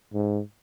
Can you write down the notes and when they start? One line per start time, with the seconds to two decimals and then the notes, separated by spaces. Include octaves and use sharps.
0.13 G#2